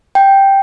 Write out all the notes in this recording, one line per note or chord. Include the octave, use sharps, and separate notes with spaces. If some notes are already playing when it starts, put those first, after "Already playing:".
G5